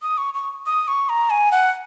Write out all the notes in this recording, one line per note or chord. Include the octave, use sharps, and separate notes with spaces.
D#6
C#6
C#6
D#6
C#6
A#5
G#5
F#5